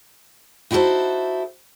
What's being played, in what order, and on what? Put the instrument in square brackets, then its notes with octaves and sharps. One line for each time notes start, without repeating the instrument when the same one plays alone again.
[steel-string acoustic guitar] D#4 E4 F#4 G#4 A4 C5